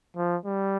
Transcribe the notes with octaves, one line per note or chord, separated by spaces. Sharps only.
F3
G3